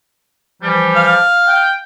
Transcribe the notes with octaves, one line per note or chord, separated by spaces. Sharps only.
E3 F3 G3
F5
G5